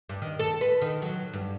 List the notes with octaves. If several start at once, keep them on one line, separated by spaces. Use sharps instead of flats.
G2
D#3
A4
B4
D#3
F#3
G2